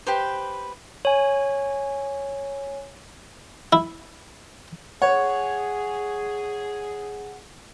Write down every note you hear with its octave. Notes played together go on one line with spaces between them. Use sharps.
G4 B4 C5
C#5 G#5
E4
G#4 C#5 F#5